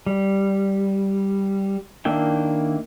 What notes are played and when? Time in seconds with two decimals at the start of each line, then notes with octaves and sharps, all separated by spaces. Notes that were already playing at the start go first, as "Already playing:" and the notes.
0.06 G3
2.05 D#3 A#3 D4 E4 G5